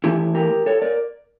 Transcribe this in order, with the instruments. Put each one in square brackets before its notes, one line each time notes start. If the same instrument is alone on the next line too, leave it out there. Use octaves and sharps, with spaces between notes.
[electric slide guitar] E3 A3 E4 G4
G4 A#4
A4 C#5
A#4 D5